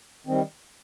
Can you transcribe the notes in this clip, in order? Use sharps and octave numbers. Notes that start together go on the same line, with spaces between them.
D#3 G3 C4